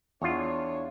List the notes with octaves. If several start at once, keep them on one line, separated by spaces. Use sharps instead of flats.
E2 D4 F4 C#5